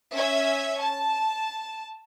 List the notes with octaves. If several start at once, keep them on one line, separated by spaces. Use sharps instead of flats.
C#4 E5 G#6
A5